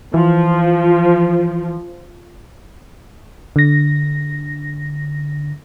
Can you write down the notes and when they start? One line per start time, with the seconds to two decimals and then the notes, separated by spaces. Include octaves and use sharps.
0.14 E3 F3
3.56 D3 A#6